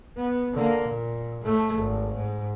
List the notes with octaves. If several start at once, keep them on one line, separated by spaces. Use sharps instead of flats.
B3
D3 A#3
A#2
A2 A3
G#1
G#2